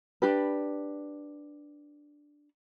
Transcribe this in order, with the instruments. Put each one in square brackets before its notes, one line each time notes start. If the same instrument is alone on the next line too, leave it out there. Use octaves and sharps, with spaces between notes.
[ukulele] D4 G4 B4